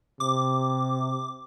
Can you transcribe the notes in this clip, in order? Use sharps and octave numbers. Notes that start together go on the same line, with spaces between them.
C3 D6